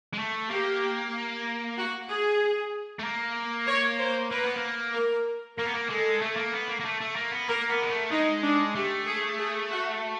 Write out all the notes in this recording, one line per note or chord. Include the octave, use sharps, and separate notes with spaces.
G#3
A3
A#3 G4
F#4
G#4
A3
A#3
C#5
C5
A#3 B4
B3
A#3
A#4
A#3 A#4
B3
A#3
G#3 A4
A3
A#3
B3
A#3
A#3
A3
A3
A#3
B3
A#3 A#4
B3
G#3
A3
G#3 D#4
D4
A3 G4
G#4
G#4
F#4